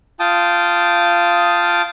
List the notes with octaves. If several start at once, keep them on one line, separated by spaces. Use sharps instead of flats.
F4 G5 A5 D#6